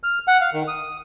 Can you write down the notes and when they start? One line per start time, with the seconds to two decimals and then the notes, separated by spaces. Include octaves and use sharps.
0.03 F6
0.28 F#5
0.41 F5
0.53 D#3
0.68 D#6